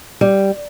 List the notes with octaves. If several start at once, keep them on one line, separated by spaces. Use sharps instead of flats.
G3